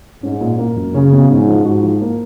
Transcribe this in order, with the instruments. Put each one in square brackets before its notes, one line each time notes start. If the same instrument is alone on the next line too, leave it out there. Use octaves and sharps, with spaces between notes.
[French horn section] G#2 [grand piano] C#4
[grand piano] A#2
A#3
F#2
[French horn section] C#3 [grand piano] C#4
[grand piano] B2
[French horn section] G#2 [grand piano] C#4
[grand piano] F3
[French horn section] G#2 [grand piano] F#4
[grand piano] F3
A#3